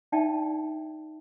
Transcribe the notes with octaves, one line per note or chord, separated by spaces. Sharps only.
D4 D#4 D5 E5 G5 A5